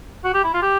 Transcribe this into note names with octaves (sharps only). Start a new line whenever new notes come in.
F#4
G4
E4
F4
G4